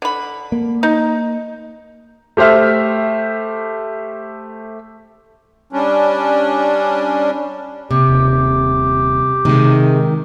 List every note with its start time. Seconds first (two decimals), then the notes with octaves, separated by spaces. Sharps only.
0.02 D3 B5
0.52 A#3
0.83 D#4
2.37 A3 G4 C5 E5 F6
5.73 G3 C#4 D4
7.91 C3 G4
8.07 D#1
9.45 C3 D#3 G#3